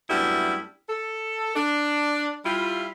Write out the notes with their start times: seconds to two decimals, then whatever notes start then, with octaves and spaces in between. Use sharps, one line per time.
0.10 F#2 G3 A3 B3 D4 E4
0.89 A4
1.56 D4
2.45 G3 E4 F4